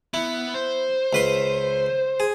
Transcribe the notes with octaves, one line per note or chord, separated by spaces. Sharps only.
B3 E4
C5
C#2 B4 C6
G#4